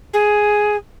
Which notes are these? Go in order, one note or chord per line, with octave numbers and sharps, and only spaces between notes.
G#4